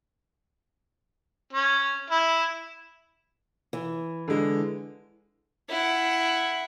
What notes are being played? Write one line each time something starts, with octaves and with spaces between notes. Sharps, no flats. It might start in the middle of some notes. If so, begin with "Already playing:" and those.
C#4
E4
E3
D3 G#3
E4 F#5